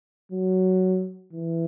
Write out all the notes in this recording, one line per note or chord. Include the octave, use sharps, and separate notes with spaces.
F#3
E3